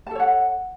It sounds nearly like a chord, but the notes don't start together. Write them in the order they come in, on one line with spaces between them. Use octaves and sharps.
A5 A4 C#5 F#5